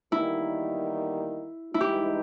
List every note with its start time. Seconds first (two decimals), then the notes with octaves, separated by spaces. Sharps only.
0.12 E2 D#3 G3 A#3 D#4 E4
1.74 E4
1.81 G2 E3 G#3 D#4 G4